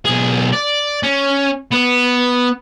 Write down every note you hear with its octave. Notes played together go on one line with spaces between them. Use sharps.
B1 G#4
D5
C#4
B3